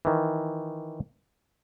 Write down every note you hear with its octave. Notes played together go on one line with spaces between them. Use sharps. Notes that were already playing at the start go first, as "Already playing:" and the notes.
D#3 E3